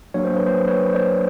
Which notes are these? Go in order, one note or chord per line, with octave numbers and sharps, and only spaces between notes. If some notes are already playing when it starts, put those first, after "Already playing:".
F#3 A#3 D4 C#5
C5
B4
C5
B4 C#5
C5 D5